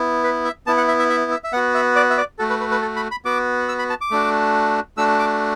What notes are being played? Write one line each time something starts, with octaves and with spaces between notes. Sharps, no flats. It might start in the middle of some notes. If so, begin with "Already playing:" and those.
Already playing: B3 E4
B4
E5
B3 E4 A5
F#5
E5
E5
E5
E5
E5
B3 F#4 F#5
E5
D5
E5
D5
A3 F#4 A4
B4
B4
B4
A4
B5
B5
B3 F#4 D6
E6
B5
A5
D6
A3 D4 F#4
A3 D4 F#4 E6
D6